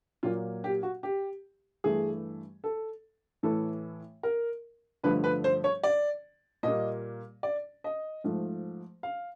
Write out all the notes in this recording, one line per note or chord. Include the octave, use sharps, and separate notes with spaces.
A#2 F#3 A#3 F4
G4
F#4
G4
G2 E3 A3 G#4
A4
A2 E3 A3 A4
A#4
G2 D3 F3 A3 B4
B4
C5
C#5
D5
A#2 G3 A#3 D#5
D5
D#5
G#2 F3 A3
F5